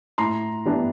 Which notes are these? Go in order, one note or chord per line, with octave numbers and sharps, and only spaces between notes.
A2 A#5 C6
E3 G3 B3 D4